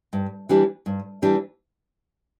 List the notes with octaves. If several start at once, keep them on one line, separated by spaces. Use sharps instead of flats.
G2
E3 G3 D4 G4
G2
E3 G3 D4 G4